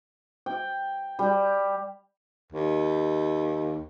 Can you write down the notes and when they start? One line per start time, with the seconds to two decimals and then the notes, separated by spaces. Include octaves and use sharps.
0.46 G5
1.19 G3
2.52 D#2